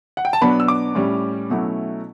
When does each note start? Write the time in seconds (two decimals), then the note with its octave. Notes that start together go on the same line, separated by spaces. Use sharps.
0.17 F#5
0.25 G5
0.33 A5
0.41 B2 F#3 B3 D4 B5
0.60 E6
0.68 D6
0.95 A2 G3 C#4
1.50 B2 F#3 A3 C#4 E4